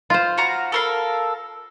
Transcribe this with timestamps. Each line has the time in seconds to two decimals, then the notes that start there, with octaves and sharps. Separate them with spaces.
0.10 F4 C5
0.38 F#4 F5 A#5
0.72 A4 A#4 F5